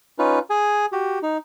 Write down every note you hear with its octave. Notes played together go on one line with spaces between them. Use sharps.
C#4 D#4 F4 B4
G#4 G#5
F#4 G4
D#4